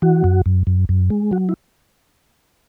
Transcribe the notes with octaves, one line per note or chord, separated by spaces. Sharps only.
E3 F#4
F#2
F#2
F#2
F#2
G#3
F#3 F#4
E4